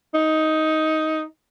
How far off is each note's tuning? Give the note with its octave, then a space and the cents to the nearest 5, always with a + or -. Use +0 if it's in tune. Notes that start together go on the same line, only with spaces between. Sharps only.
D#4 +10